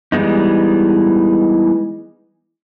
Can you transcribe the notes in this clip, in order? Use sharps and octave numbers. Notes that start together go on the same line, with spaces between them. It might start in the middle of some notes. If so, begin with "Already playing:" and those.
E3 G3 G#3 B3 D#4